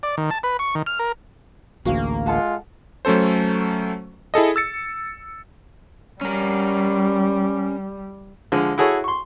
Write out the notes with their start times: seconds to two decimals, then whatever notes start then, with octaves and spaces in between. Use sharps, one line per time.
0.03 D5
0.18 D#3
0.31 A5
0.43 B4
0.59 C#6
0.75 D#3
0.86 F6
0.99 A#4
1.85 A1 D2 A#3 F#4 G#4 F5
2.26 G#3 F4 A4 F#5 A5
3.05 F#3 A3 C#4 A4 C5
4.34 E4 G#4 A4 D#5
4.56 E6 A6 C#7
6.21 G3 C#4 A#4
8.52 D3 F3 G#3
8.78 E4 F#4 G#4 A4 C#5
9.04 C6 C#6